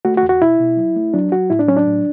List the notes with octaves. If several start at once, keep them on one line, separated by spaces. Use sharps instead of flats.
A3 F#4
F#4
E2
F#4
B2 E4
B2
F#3
A3
F#3 D4
F#3 F#4
A2 E4
D4
F#3 C#4
D4
A2